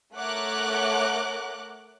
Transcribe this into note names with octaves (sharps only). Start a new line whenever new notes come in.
A3 A#4 C#5 F#5 D6 F#6